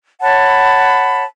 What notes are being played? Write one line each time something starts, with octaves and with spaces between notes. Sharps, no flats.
C#5 F#5 A5 B5